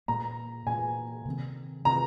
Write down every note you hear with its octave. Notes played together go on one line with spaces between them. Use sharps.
A#2 A#3 A#5
A#2 A#3 G#5
C3 D#3 C4
C3 D#3 C4 A#5